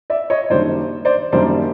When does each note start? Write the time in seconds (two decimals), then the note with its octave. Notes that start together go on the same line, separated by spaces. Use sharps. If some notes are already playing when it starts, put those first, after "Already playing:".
0.10 D5 E5
0.30 C#5 D#5
0.50 F#2 D#3 G3 A#3 D4 C5 D5
1.05 C5 D5
1.32 F#2 D#3 G3 A#3 D4 C5 D5